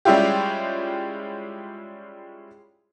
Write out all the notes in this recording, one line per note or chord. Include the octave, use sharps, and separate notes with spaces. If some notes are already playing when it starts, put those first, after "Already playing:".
G3 G#3 C#4 E4 F4 G4